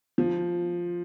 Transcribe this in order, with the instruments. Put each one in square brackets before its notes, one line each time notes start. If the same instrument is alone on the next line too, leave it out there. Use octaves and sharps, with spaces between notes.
[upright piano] F3